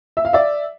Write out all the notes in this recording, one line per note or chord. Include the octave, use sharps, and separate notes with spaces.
E5
F5
D5 E5